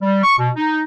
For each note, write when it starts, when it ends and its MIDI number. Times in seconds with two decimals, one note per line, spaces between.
0.02 0.21 55
0.23 0.36 85
0.38 0.50 47
0.56 0.81 63